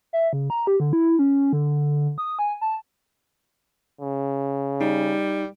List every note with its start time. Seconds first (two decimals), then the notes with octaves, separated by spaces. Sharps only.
0.13 E5
0.33 C#3
0.50 A#5
0.67 G4
0.80 D3
0.93 E4
1.19 C#4
1.53 D3
2.18 D#6
2.39 G#5
2.61 A5
4.01 C#3
4.81 G3 D#4